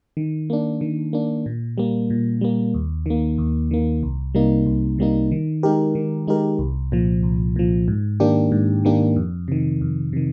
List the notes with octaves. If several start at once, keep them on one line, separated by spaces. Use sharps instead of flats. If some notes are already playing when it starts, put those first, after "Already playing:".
D#3
A#3 D4
D#3
A#3 D4
A#2
G3 A#3
A#2
G3 A#3
D#2
D#3 A#3
D#2
D#3 A#3
C2
C3 G3 A#3 D#4
C2
C3 G3 A#3 D#4
D#3
G#3 D#4 G4 A#4
D#3
G#3 D#4 G4 A#4
C2
A#2 F3
C2
A#2 F3
G#2
D#3 A#3 D4 G4
G#2
D#3 A#3 D4 G4
F2
C3 D#3
F2
C3 D#3